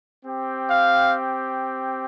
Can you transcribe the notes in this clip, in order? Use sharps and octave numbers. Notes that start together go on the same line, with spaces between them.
C4 G4
F5